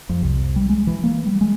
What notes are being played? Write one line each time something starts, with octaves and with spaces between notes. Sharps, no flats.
F2
C2
G3
G#3
E3
A#3
G3
G#3